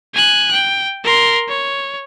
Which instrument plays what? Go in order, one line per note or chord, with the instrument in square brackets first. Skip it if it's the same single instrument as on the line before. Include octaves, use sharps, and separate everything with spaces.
[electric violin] G#5 F#6
G5
A#4 C6
C#5